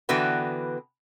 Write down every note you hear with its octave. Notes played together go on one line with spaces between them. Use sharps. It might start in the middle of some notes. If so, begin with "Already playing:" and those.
D3 E3 B3 F#4 B4 G5